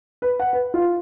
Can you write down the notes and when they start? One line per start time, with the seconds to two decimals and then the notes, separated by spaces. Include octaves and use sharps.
0.22 B4
0.39 F#5
0.53 B4
0.74 F4